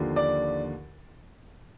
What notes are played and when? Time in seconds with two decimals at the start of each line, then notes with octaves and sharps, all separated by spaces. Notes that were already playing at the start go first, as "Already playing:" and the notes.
Already playing: D#2 D3 F3
0.16 D5